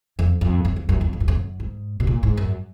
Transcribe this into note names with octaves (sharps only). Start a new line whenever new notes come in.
F2
F2
F#2
F2
F#2
F2
G#2
F#2
F2
F#2
G#2
B2
A#2
G#2
F#2